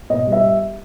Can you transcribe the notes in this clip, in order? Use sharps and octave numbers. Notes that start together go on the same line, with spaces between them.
B2 D#5
G3
E5